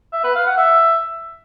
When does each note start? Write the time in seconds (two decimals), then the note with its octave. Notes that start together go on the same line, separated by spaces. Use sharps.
0.12 E5
0.24 B4
0.35 F5
0.46 F#5
0.58 E5